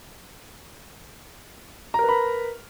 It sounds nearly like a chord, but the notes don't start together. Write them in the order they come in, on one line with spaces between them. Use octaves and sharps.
A#5 A#4 B4 B5